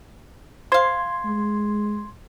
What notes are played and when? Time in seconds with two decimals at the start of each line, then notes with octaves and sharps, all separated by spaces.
0.72 C5 F5 C6 G#6
1.25 G#3